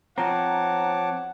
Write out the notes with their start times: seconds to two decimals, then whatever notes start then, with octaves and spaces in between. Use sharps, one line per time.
0.18 F3 C4 C#5 F#5 A5 A#5 D6